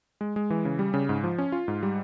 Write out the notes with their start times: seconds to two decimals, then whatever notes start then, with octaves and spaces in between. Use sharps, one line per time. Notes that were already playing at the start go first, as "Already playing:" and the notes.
0.21 G#3
0.36 G#3
0.50 E3
0.65 C#3
0.79 G3
0.94 C#3
1.09 G#2
1.23 F3
1.38 C#4
1.52 F4
1.68 G#2
1.83 G3